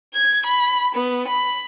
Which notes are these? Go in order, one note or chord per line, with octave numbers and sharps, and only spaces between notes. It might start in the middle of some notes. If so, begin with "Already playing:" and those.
G#6
B5
B3
B5